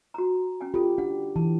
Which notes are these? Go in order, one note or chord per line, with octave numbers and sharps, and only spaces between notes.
F#4 A#5
C#4 G5 G#5
F4 G4 A4
D4 F#5
E3 A5